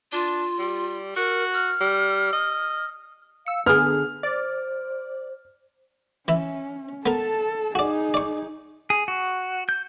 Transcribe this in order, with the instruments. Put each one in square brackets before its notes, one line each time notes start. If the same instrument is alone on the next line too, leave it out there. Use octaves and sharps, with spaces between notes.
[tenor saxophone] D4 [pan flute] F4
[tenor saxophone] G3
[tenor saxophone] F#4 [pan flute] A#4
[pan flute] F6
[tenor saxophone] G3
D#5
[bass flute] F5 [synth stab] E6 C#7
[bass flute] D3 [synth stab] B3 G#4 [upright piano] F6
[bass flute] C5 [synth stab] D5
[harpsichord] E3 E4 [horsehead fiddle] C#4
[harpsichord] B3 A#4 [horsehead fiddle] A4 A5
[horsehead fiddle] D#4 G#4 [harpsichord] F#4 D5
[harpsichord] D5 C#6
[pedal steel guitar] G#4
F#4
G6